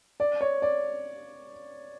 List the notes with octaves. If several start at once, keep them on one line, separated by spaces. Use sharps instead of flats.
D5
C#5
D5